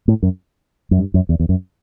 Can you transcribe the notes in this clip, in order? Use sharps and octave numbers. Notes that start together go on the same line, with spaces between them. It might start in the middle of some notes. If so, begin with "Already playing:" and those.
A2
F#2
F#2
G2
F#2
E2
E2
F#2